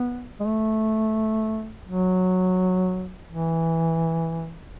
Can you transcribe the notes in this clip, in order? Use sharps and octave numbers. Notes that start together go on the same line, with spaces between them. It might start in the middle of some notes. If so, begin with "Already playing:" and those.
Already playing: B3
G#3
A3
F#3
E3